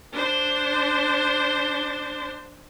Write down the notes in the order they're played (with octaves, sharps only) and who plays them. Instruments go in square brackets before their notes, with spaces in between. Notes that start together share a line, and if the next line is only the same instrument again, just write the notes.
[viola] D4 C5